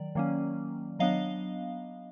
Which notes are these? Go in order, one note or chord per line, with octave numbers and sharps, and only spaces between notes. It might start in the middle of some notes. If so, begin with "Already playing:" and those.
Already playing: D#3 F#3 D5
D#3 F#3 A#3 C#4
F#3 B3 D4 D#5 F5